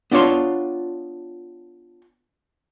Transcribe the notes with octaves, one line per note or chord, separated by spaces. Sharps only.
B3 D4 F4 C#5 C6